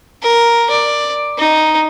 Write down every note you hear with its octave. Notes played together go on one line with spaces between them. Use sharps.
A#4
D5
D#4